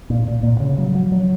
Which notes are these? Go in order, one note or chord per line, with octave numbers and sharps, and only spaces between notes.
A#2
A#2
A#2
C#3
F#3
F#3
F#3